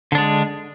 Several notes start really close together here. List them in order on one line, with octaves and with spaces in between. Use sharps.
D3 D4 G#3